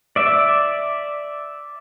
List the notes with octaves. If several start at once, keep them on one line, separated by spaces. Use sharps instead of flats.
D5 E5